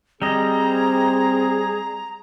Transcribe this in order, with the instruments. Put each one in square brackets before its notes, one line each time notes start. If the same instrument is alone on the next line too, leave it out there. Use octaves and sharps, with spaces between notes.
[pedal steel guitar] G3 D#5 [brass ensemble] C4 [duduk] G#4 [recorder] A#5